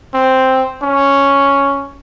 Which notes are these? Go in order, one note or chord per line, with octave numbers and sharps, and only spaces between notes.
C4
C#4